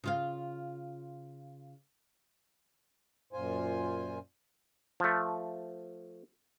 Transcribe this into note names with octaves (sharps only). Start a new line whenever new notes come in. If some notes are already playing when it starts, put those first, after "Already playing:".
C#3 F4 F5
F#2 A#2 F4 C5 G#5
F3 A3